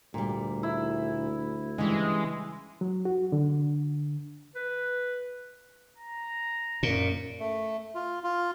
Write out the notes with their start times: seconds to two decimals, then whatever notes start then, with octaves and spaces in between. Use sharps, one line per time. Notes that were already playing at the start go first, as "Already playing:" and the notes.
0.14 D2 A#2 G3
0.63 E4
1.78 C#3 E3 G3 G#3
2.81 F#3
3.05 F#4
3.32 D3
4.55 B4
5.98 A#5
6.83 F#2 A#2
7.40 A3
7.95 F4
8.23 F4